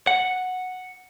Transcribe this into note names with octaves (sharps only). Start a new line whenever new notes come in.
F#5